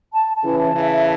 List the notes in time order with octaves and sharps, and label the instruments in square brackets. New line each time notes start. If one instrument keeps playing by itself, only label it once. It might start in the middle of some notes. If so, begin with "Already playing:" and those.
[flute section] A5
A5
[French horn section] C#3 E3
[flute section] A5
[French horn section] C#3 E3
[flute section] E5